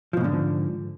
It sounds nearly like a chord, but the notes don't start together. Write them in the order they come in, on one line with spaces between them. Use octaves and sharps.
F3 B2 G#2 D3